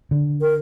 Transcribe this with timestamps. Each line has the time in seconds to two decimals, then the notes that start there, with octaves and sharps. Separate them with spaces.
0.11 D3
0.41 A#4